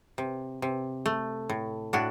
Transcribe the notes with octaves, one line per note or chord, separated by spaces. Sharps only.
C3
C3
A3
A2
A2 D4 F#4